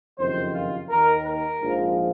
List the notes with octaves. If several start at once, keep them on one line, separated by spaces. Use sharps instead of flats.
F#1 F2 C3 D#3 C5
F4
D#2 D#3 A#4
A#4
A#1 G#2 F3